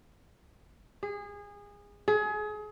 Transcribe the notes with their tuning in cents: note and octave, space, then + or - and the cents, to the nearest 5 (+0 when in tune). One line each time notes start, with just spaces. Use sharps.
G#4 -25
G#4 +30